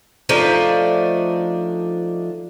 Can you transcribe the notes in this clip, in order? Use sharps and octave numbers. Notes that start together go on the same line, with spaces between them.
F3 A3 D4 D#4